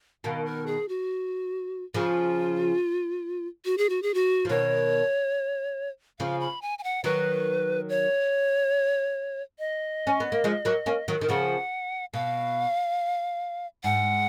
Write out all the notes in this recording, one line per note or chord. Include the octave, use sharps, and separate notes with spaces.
B2 D#3 F5
A#4
G#4
F#4
C#3 F3 F4
F#4
G#4
F#4
G#4
F#4
F3
B2 D#3 C#5
C#3 F3 F5
B5
G#5
G#5
F#5
D#3 F#3 B4
C#5
D#5
C#4
B3
A#3
F3 G#3
F#3 A#3
A#3 C#4
D#3 F#3
D#3
C#3 F3 F#5
B2 F5
G#2 F#5